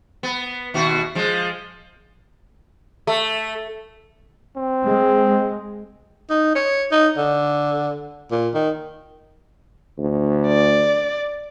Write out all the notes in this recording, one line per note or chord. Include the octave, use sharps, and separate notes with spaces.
B3
D#2 B2 F#4
F3 G#3
A3
C4
G#3
D#4
C#5
D#4
D3
A#2
D#3
D2
D5